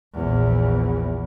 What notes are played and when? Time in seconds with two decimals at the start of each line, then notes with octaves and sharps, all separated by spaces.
0.14 A#1 E2